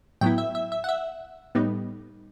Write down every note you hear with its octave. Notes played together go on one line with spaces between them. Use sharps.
A2 F#3 B3 E4 G5
E5
E5
E5
F#5
E5
A2 G3 B3 D#4